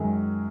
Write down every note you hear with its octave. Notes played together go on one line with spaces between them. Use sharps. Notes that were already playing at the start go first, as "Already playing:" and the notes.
Already playing: F#2 D#3 G#3